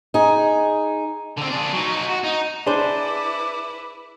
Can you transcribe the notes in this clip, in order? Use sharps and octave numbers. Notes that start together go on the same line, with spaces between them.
D#4 G#4
D3 C4
D4 G#4
F#3 D#4
D#4 F#4
F#4
D#4
D4 E4 G#4 B4 C5 D6